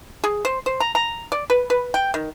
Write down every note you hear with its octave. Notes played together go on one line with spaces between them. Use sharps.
G#4
C5
C5
A#5
A#5
D5
B4
B4
G5
D#3